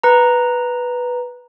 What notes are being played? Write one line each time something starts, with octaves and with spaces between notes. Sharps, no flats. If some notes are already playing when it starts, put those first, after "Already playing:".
B4 A#5